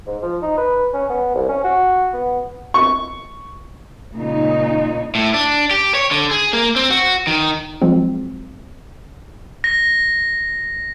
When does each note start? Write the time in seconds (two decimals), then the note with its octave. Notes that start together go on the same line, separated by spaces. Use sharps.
0.07 G#2
0.22 F3
0.42 D#4
0.58 B4
0.94 C#4
1.10 B3
1.34 C2
1.49 C#4
1.64 F#4
2.13 B3
2.74 C#6
4.16 A#2 C#3 G#3 D#4
5.15 A2
5.34 D4
5.71 G4
5.95 C#5
6.11 D3
6.31 G#4
6.53 A#3
6.76 C4
6.90 F#4
7.27 D#3
7.82 F3 F#3 G#3 C4
9.64 A#6